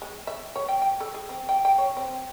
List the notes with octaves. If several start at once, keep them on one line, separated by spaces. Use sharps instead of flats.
G#3
E5
C#5
G5
G5
A4
G#4
C4
G5
G5
C#5
C4